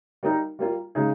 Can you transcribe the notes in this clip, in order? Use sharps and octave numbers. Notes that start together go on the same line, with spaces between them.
G3 A#3 D#4 A#4
G3 A#3 F4
C#3 G#3 D#4 G#4